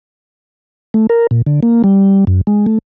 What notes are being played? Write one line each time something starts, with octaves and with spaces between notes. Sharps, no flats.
A3
A#4
A#2
D3
A#3
G3
F#2
G#3
A3